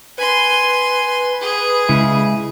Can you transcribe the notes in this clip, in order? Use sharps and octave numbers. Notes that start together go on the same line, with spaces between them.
B4 G#5 C6
G#4
C#3 G#3 E4